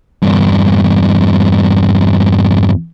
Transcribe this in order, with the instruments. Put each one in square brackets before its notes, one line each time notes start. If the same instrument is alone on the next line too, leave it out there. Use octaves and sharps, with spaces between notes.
[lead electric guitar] E2 G2